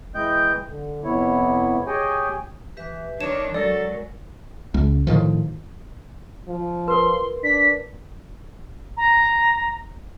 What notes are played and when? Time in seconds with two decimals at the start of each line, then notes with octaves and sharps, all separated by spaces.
0.15 E3 G#3 D#5 G5 G6
0.69 D3
1.04 F2 C3 B3 E4 C#5
1.87 G4 G#4 C#5 D#5 G5 G#5
2.77 E3 G4 B4 E5
3.21 D#3 D4 C#5 A5 E7
3.54 F#3 G#3 A4 A#4 D5
4.74 C#2
5.07 A2 D#3 F3
6.48 F3
6.88 A#4 B4 C6
7.44 D4 B6
8.97 A#5